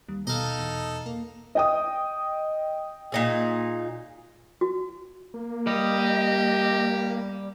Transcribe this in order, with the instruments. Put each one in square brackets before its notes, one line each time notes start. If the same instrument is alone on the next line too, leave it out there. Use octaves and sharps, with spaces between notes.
[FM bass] D#2 [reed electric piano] G3
[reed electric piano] B2 [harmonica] D#4 A4 [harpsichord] D#5 F5
[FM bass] E2
A#3
[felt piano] D#5 G5 D#6
[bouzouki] A#2 D#4 G#4
[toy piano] F#4
[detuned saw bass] A#3
[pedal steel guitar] G3 [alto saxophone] G4 [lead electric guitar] D#5